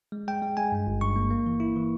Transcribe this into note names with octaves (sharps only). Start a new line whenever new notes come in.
G#3
G#3 G5
G#3
G#3 G#5
G2
G1
G2 C#6
A#3
A#3
E3
E4
E3